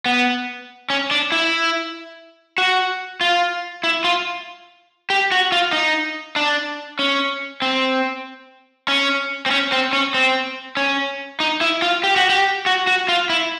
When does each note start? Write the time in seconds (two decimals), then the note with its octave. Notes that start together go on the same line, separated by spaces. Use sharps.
0.06 B3
0.90 C#4
1.11 D4
1.32 E4
2.58 F#4
3.21 F4
3.84 E4
4.04 F4
5.10 G4
5.32 F#4
5.52 F4
5.73 D#4
6.36 D4
6.99 C#4
7.62 C4
8.88 C#4
9.46 C4
9.51 C#4
9.72 C4
9.93 C#4
10.14 C4
10.77 C#4
11.40 D#4
11.61 E4
11.82 F4
12.04 G4
12.16 F#4
12.30 G4
12.66 F#4
12.87 F#4
13.08 F4
13.30 E4